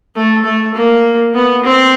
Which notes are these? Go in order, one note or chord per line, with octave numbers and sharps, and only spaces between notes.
A3
A3
A#3
B3
C4